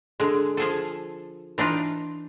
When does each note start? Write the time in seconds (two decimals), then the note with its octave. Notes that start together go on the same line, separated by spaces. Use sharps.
0.20 D3 G#3
0.57 F3 G#4 A4
1.58 E3 D4 D#4 F4